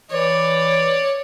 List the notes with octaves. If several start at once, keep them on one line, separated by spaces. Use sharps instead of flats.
E3 C#5 D5